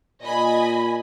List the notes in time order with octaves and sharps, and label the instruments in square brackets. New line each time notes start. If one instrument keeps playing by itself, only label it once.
[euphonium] A#2 [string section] D#5 G#5 B5